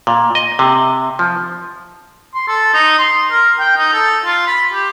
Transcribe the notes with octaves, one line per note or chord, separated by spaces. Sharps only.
A#2
D#5
C3
F3
C6
A4
D#4
C6
A#4
G5
D#4
A4
F4
B5
G4